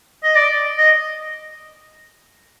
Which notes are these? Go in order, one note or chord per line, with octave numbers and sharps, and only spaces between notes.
D#5
D5
D#5